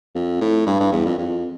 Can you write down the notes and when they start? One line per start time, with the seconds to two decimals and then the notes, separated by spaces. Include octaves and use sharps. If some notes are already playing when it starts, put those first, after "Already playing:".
0.15 F2
0.41 A2
0.67 G2
0.80 G2
0.92 E2
1.06 F2
1.18 F2